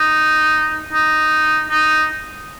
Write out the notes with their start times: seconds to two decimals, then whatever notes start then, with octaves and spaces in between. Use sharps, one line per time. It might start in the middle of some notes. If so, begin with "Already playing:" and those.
Already playing: D#4
0.93 D#4
1.70 D#4